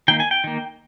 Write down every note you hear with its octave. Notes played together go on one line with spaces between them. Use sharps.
D#3 A#3 G5
G#5
G5
D#3 A#3